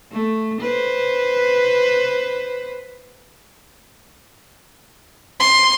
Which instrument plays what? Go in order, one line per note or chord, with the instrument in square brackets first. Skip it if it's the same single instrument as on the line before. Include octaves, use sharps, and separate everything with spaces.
[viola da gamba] A3
B4 C5
[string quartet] C6